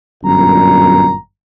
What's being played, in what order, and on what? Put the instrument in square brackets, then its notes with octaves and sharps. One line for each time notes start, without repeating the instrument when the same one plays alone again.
[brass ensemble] G1 F#2 A#2 A#5